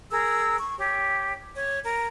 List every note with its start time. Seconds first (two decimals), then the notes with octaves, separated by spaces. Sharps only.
0.11 G#4 A#4 E6
0.59 C#6
0.79 G4 C#5
1.55 C#5
1.84 A#4